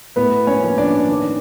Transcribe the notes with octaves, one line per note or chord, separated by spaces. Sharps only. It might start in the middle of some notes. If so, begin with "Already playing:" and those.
A2 B3 B4
C#4 C#5
F3 A#3
D4 D5
D#3